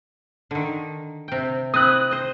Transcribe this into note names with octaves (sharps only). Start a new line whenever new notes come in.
D3 D#3
C3 G5
C4 E4 D#6 F#6
C5 D#5